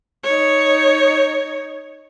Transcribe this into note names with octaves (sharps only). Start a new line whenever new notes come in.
D#4 C#5